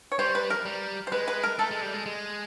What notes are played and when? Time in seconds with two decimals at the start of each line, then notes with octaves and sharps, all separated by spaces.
0.12 C#5
0.19 G3 C5
0.35 B4
0.50 A#4
0.66 G3
1.07 C5
1.12 G#3 B4
1.28 B4
1.43 A#4
1.59 A3 A4
1.71 G#3
1.82 G3
1.94 G#3
2.06 G#3